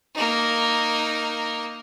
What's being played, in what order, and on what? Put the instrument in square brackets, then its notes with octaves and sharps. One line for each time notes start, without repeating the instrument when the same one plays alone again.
[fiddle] A#3 D#4